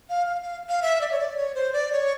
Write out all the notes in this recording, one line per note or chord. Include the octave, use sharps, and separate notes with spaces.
F5
F5
F5
F5
E5
D5
C#5
D5
C#5
C5
D5
C#5